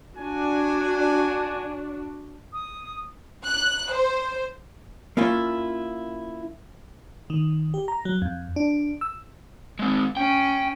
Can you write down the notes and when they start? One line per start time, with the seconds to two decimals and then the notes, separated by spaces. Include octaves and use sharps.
0.17 D4 F#4 G#5
2.53 D#6
3.45 F#6
3.92 C5
5.17 A#3 C#4 E4 F4
7.30 D#3
7.74 G4
7.88 A#5
8.05 F#3
8.22 F2
8.56 D4
9.01 E6
9.79 G#3 C4
10.17 C#4 G5